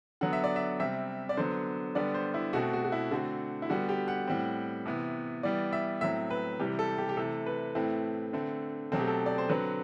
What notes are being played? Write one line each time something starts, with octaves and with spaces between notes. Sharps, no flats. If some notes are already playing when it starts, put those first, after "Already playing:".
D3 F#3 B3 F#5
E5
D5
E5
C3 G3 C4 E5
D5
D3 F#3 B3 C5
D3 G3 B3 D5
C5
E4
B2 A3 C4 F#4
F#4
F#4
E4
D3 A3 C4 F#4
E4
D3 G3 B3 F#4
G4
F#5
A2 G3 C4
C3 E3 B3
E3 G3 B3 D5
E5
A2 F#3 C4 E5
B4
C3 E3 G3 G4
A4
G4
G4
C3 E3 A3 A4
B4
A2 E3 A3 C4
D3 A3 C4
B2 F#3 A3 C4 A4
G4
A4
D5
C5
D3 F#3 C4 B4